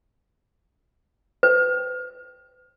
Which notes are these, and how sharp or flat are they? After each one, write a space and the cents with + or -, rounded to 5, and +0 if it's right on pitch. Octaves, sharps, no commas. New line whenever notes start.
B4 +35